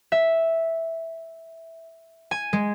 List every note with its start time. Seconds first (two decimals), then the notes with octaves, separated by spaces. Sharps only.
0.12 E5
2.31 G#5
2.53 G#3